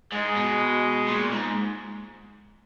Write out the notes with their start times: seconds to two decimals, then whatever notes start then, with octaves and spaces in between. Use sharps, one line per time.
0.12 G#2 G#3
0.36 B2
1.08 A#2
1.32 G#2